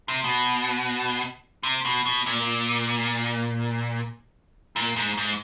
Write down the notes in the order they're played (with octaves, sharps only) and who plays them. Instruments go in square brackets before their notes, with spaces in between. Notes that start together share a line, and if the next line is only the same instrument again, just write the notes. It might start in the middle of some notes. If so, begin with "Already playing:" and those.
[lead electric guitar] C3
B2
C3
B2
B2
A#2
A#2
G#2
G#2